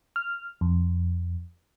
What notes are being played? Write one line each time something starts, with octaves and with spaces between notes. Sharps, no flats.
F6
F2